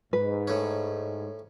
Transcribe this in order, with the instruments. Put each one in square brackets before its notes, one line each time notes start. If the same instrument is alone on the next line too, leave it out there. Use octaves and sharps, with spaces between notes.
[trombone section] G#2 [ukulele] B4
[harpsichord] A2 C#4